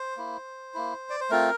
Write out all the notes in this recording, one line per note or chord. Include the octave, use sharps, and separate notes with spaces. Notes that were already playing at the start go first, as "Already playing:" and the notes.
Already playing: C5
A#3 E4
A#3 E4
D5
C5
A3 C4 F4 A#4